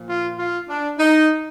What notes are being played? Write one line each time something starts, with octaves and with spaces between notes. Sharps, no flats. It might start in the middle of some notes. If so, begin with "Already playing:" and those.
Already playing: A#2 F3
F4
F4
D4
D#4